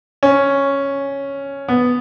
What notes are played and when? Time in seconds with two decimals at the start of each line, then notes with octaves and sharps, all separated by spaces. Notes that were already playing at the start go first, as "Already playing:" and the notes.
0.23 C#4
1.68 B3